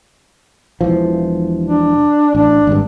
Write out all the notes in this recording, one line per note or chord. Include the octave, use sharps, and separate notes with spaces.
E1 E3 F3
D4
A1 D4
G#1 G2